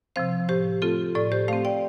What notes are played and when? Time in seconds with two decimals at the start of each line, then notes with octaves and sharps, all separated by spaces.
0.16 C3 F3 C4 C5 F5
0.49 A2 G4 C5
0.82 A3 C4 F4 A4
1.15 A2 A4 D5
1.32 G4 C5
1.48 A3 C4 C5 F5
1.65 D5 G5